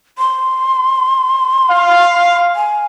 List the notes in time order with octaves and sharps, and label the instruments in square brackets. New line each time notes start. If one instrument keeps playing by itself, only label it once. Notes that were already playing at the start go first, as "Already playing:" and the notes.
[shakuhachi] C6
[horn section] F5
[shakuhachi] G#5